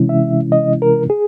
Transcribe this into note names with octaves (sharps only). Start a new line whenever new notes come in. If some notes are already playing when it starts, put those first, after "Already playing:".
Already playing: C3 E3 G#3 C#4 E4
E5
D#5
A#4
G#4